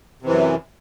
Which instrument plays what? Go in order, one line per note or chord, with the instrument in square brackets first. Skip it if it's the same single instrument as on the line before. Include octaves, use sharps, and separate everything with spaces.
[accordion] C3
E3
F#2